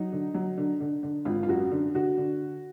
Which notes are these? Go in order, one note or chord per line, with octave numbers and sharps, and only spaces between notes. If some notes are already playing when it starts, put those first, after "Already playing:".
Already playing: F#3 D#4
D3
F#3
D3
D3
D3
G#1 F4
F4
F#2 F#4
D3
D3 F#4
D3